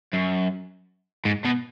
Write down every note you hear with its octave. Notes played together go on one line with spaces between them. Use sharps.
F#2
G#2
B2